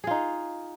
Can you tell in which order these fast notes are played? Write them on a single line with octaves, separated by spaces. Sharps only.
G#4 F4 D#4